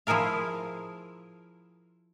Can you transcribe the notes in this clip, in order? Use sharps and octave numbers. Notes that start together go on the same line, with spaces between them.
F3 E4 G#4 A#4 F5